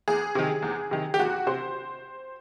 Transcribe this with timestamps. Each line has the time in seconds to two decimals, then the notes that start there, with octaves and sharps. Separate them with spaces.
0.08 E2 G#4
0.35 C3 D#3
0.62 E2
0.91 C3 D#3
1.14 G4
1.19 E2 F#4
1.47 C3 C5